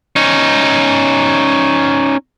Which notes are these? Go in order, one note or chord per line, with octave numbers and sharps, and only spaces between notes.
C#4 D#4